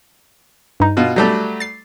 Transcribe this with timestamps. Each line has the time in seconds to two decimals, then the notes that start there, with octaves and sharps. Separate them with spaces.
0.80 G2 D#4
0.97 B2 F4
1.16 F#3 G3 A3
1.60 A6 C7